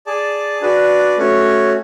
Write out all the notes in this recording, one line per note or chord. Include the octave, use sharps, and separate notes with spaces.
G#4 D5 A5
D4 F#4 B4 D5
A3 C#4 F#4 C#5